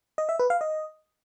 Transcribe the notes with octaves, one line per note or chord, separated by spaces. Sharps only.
D#5
E5
B4
F5
D#5